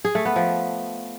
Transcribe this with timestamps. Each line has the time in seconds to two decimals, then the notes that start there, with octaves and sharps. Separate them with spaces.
0.05 G#4
0.15 A3
0.25 B3
0.36 F3